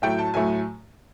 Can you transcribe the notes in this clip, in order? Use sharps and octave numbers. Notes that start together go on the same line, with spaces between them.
A2 F#3 A3 G5
A5
A2 F#3 A3 G#5